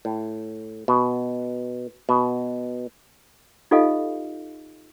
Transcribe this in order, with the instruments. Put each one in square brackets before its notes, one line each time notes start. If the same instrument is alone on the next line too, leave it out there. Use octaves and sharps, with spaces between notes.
[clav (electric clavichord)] A2
B2
B2
[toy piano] D#4 F4 G4 A4 D#5 F5